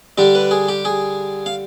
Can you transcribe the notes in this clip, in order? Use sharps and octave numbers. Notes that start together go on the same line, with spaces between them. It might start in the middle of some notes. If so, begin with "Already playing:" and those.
D3 G3 D4 G4
B4
G#4
G4
G#4
F5